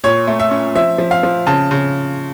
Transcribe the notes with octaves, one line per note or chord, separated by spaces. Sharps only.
A#2 C#5
A3
E5
C#4
F3 E5
F3
F5
F3
C#3 A5
C#3